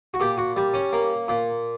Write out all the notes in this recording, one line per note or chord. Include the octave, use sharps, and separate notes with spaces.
F#4
A#2 G4
F#4
G3
C#4
A#3
A#2